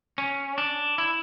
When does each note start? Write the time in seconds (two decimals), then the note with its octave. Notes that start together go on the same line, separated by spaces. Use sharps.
0.18 C#4
0.58 D4
0.98 E4